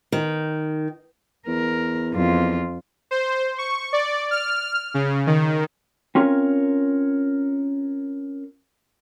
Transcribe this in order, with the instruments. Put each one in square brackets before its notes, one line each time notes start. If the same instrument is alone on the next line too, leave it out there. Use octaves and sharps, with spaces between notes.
[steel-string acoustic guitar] D#3
[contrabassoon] E2 [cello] A#4
[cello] F2 F4
[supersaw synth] C5
C#6
D5
F6
C#3
D#3
[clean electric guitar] C4 C#4 F4 A#4 C#5